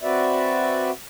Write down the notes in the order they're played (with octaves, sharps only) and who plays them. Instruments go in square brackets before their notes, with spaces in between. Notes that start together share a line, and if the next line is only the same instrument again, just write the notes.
[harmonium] C4 F#4 B4 D5 E5